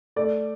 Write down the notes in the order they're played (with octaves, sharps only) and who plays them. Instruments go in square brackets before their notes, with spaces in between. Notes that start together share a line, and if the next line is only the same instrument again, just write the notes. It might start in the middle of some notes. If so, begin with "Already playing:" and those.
[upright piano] A3 D5